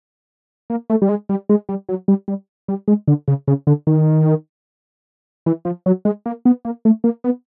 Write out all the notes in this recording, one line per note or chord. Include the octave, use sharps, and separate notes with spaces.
A#3
A3
G3
G#3
G3
G#3
G3
F#3
G3
G3
G3
G#3
D3
C#3
C#3
D3
D#3
E3
F3
F#3
G#3
A#3
B3
A#3
A3
A#3
B3